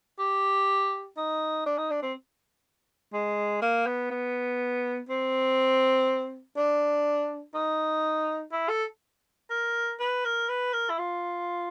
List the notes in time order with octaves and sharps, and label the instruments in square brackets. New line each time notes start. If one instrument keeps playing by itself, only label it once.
[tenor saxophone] G4
D#4
D4
D#4
D4
C4
G#3
A#3
B3
B3
C4
D4
D#4
E4
A4
A#4
B4
A#4
B4
A#4
E4
F4